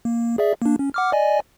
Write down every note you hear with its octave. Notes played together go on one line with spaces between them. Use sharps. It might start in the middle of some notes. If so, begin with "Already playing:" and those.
A#3
G#4 D5 E5
A#3 D4
C#4
F#5 D6 F6
D5 D#5 G#5